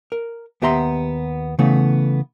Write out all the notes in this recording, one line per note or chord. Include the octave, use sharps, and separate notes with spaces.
A#4
D#2 B3 G4 E5 A#5 C6
C#3 E3 A3 B3